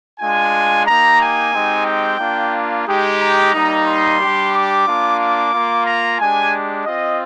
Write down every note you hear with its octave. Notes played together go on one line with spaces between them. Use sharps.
G#3 D4 F4 G#5
A#3 D#4 G4 A#5
G#5
G#3 C4 D#4 G4
G5
A#3 D4 F4
G#3 D#4 G4
A#5
G3 A#3 D#4
C6
G3 D4 G4
D6
A#3 D4 F4
D6
A#3 F4
A#5
G#3 D4 G4 G#5
C4 F4 D#5